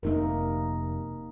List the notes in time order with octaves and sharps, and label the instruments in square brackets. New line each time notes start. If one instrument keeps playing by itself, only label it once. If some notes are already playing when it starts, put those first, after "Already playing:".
[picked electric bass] F1 C3 [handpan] A#3 D#4 A#4